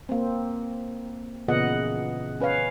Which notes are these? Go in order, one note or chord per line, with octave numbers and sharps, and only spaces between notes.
A#3 C4
A#2 C#3 E3 B3 D#5 F#5
C#4 B4 C#5 F5